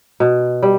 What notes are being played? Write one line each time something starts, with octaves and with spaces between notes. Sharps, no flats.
B2
G3